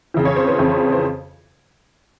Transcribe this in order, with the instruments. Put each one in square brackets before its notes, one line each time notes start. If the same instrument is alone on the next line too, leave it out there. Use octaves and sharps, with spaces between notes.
[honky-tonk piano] F2 C#3 E3
C#5
C5
B4
F2 C#3 E3
C5